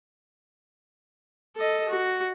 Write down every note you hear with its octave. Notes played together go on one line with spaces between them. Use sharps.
A4 D#5
F#4